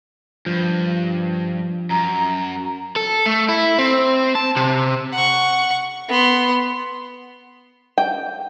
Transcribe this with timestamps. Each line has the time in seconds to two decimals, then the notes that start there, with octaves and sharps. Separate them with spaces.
0.46 G2 F3
1.90 F#2 A#5
2.96 A4
3.26 A3
3.49 E4
3.78 C4
4.35 A5
4.56 C3
5.12 F#5 C#6
6.08 B3 C6
7.98 G5